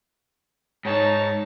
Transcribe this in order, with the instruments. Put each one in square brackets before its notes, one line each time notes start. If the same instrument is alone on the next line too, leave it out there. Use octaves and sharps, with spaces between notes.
[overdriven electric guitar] G#2 [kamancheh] D#4 A5 [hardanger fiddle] C#5